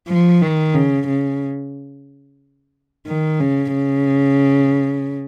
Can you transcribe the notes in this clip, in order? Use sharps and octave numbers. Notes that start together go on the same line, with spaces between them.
F3
D#3
C#3
C#3
D#3
C#3
C#3